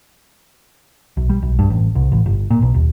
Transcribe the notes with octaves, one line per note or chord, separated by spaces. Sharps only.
B1
G3
B1
G2
A1
C2
A1
G1
A#2
B1
D#1